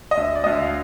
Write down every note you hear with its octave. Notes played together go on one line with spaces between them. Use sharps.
D#5
D2 E5
D5
D2 D#5
E5
F5